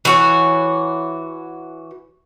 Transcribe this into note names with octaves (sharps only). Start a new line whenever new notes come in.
E3 F#4 C#5